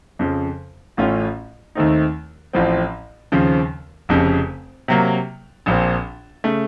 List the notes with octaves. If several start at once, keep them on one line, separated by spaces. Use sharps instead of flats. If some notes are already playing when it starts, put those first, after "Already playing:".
F2 C#3 F3
A1 A2 A3 C#4 F4
D#2 D#3 A3 C4 D#4
A1 A2 F3 C4
D#2 C#3 F3 C4
F1 F2 C#3
C3 F#3 A#3
A#1 A#2 F3 C4
C#3 A3